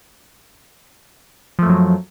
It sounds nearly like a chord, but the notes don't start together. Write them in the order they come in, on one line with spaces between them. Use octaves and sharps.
F3 A3 F#2 F#3